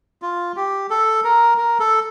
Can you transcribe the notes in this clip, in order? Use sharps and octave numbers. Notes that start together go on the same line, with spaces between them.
F4
G4
A4
A#4
A#4
A4